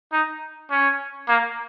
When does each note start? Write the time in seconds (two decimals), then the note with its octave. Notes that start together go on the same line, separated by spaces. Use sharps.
0.12 D#4
0.71 C#4
1.29 A#3